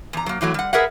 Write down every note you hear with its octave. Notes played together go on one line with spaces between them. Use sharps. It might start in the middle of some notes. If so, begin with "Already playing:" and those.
E2 A#5
F#3 A#3
A2 E3 F#3 A3
G3 F#5
G#4 A#4 B4 E5 F#5